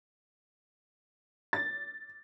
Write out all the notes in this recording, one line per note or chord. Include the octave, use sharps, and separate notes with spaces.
A6